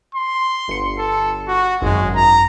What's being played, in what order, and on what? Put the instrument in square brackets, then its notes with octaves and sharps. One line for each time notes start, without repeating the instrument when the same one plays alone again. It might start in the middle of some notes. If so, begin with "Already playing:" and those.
[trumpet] C6
[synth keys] G1 C#7
[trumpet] A4
F#4
[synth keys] G#1 F#2 [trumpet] G#3
[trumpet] A#5